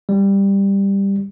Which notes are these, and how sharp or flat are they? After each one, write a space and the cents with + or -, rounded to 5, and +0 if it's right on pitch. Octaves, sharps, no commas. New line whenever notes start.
G3 +10